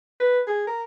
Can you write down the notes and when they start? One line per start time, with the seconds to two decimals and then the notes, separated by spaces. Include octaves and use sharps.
0.20 B4
0.47 G#4
0.67 A#4